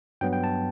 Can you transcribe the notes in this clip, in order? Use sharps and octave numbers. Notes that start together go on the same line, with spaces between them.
G2 F#3 B3 G5
G5
A5